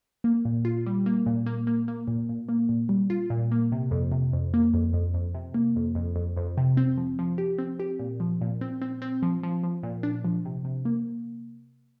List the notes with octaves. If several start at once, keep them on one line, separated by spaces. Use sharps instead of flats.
A#3
A#2
F4
G3
A#3
A#2
A#3
A#3
A#3
A#2
A#2
A#3
A#2
G3
F4
A#2
A#3
C3
F2
C3
F2
A#3
F2
F2
F2
C3
A#3
F2
F2
F2
F2
C3
C4
F3
F3
G4
C4
G4
A#2
F3
A#2
C4
C4
C4
F3
F3
F3
A#2
D4
F3
C3
C3
A#3